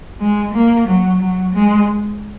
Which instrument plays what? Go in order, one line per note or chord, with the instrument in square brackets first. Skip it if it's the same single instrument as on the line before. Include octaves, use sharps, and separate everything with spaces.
[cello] G#3
A#3
F#3
F#3
G#3